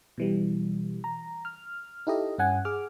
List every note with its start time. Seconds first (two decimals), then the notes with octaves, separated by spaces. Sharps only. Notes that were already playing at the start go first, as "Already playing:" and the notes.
0.18 B2 E3 G3
1.04 A#5
1.45 F6
2.07 D#4 E4 G4 A4 D#5
2.38 G2 C#4 F#5 G#5
2.65 G#4 D6 F6